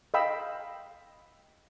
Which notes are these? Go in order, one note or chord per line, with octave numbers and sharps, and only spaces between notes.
D#5 F5 G5 B5 E6